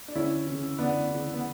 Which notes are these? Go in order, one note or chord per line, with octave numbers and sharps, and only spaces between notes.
D4
D2 C#4 E4
C#3 E3
D2 B3 D4
C#3 E3
B3